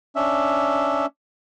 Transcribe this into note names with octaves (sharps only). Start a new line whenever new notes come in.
C#4 D4 E5